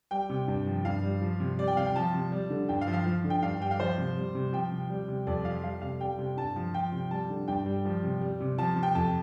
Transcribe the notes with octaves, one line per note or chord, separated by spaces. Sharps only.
G3 G5
C3
G2
F3
G2 F5
G3
F3
C3
G3 D5
G5
C3 F5
G5
F3 A5
C3
G3
D3
G2 G5
F5
F3
F5
F3
D3
G5
G2 F5
G3 G5
F5
F3 C5
C3
G3
C3
F3 G5
C3
G3
C3
F2 D5
F3 F5
G3 F5
C3 F5
G3 G5
C3
G2 A5
F3
F3 G5
C3
G3 A5
D3
G2 G5
G3
F3
C3
G3
C3
F3 A5
C3
G5
F2 A5